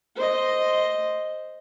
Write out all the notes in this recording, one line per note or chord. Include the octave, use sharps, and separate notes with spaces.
C5 D#5